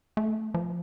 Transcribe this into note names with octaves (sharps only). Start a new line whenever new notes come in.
A3
F3